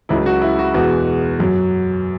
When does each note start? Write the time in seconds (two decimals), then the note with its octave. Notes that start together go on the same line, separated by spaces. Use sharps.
0.09 C#2 C#3 F#3 E4
0.26 F#4
0.41 E4
0.59 F#4
0.74 E2 B2 G#3 F#4
1.39 F#2 F#3